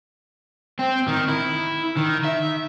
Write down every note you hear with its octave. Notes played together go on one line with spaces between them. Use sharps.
C4
D#3
E4
D#3
E5